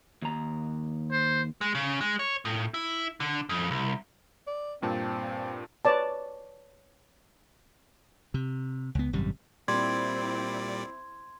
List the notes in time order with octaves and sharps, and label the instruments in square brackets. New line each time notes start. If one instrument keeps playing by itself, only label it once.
[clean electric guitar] D#2 A#5
[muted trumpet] C5
[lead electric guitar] G#3
C#3
G#3
C#5
A2
E4
D3
F2
C2
[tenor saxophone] D5
[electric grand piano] G2 A#2 A5 [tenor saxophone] C4
[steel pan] B4 C#5 D5 A5
[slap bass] C3
C#2 B3
G#1 F#2 C3 G3
[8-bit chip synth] A#2 G3 D5 [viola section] C4 E4 [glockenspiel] C6 G#6